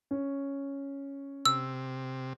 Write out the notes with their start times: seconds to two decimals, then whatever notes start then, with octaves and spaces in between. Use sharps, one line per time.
0.11 C#4
1.46 C3 E6